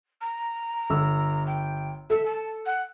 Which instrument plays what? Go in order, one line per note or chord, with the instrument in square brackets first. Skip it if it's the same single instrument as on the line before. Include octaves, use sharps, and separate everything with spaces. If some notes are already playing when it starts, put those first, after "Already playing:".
[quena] A#5
[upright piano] G1 E6
[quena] G5
[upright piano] A4 [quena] E5
[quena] A5
F#5